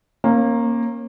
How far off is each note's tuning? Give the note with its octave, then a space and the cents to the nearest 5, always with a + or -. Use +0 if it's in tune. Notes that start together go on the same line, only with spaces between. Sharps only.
A#3 +0 C#4 -35